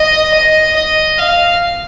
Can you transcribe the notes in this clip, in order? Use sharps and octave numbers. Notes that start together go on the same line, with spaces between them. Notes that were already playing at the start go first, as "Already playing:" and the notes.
Already playing: D#5
D#5
D#5
F5